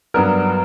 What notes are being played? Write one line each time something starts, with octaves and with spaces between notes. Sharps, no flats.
G2 F#3 B3 D4 A#4